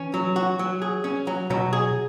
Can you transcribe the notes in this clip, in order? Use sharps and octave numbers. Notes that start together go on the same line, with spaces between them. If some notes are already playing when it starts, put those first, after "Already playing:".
Already playing: E3 C#4
F#3
F#4
F#3
G#4
C#4
F#3
B2 F#3
G#4